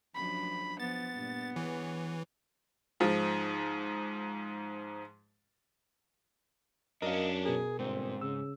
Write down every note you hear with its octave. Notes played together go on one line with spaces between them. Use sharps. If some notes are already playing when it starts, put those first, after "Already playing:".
F#2 F3 D4 B5
F3 B3 A6
G2 A#2
E3 G#4 C#5
G#2 F3
F#2 C#4 D4 A#4 D#5 F5
B2 G#4 A#4
G1 G#2 C4
C#3 E6